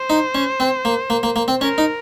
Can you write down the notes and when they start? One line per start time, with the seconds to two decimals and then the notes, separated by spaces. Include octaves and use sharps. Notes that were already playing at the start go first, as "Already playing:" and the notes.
Already playing: C5
0.10 D#4
0.35 C#4
0.60 C4
0.85 A#3
1.10 A#3
1.23 A#3
1.36 A#3
1.48 C4
1.61 C#4 A#4
1.78 D#4